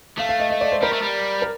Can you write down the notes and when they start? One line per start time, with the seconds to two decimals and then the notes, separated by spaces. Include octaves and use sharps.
0.18 A3 F5
0.29 F5
0.40 D#5
0.50 D#5
0.61 D5
0.72 C5
0.82 G3 A#4
0.93 A3
1.02 G3
1.42 A#4